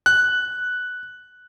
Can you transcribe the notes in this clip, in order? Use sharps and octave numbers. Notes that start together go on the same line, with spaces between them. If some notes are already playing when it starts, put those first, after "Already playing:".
F#6